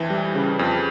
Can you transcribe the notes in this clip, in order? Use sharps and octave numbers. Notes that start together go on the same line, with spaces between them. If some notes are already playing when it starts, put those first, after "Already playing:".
Already playing: F2 E3 E5
G3
C#3
F2